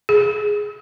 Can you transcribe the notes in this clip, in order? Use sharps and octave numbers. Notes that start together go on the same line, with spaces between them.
G#4